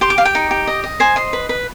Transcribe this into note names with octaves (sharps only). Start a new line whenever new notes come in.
G4 C6
D6
G4 F5
G5
D#4
G4
D#5
D#5
C5 G#5
D#5 C6
B4
B4